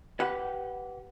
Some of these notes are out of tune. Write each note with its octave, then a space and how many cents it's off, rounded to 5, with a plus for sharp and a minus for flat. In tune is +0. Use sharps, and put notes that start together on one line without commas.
G4 -20 B4 +0 F#5 +0